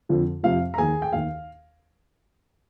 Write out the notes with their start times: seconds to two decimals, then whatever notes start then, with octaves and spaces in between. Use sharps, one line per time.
0.09 F2 D3 F3
0.43 F2 C3 F3 F5
0.74 A#5
0.78 D#2 D#3 G#4 G#5
1.02 G5
1.13 D#2 D#3 F5